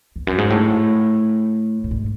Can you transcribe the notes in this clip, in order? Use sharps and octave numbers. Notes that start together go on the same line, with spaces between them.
E2
F#2
G#2
A2
A2
G#2